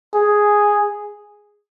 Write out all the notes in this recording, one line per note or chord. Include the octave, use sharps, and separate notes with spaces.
G#4